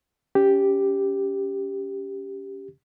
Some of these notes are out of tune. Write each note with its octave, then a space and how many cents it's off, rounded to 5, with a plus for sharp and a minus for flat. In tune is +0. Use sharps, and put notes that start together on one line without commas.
C#4 +15 G4 +0